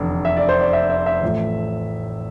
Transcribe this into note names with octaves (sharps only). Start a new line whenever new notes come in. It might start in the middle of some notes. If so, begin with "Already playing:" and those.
Already playing: F1 E2 D3
E5
D5
C5
D5
E5
E5
E5
A1 A2 F3 A3